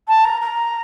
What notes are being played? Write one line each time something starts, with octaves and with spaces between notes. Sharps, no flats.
A5
A#5
A#5